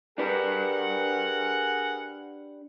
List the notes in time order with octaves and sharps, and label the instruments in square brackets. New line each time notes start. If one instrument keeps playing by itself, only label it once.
[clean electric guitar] D4 G4 B4 [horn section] G#4 A#4 F#5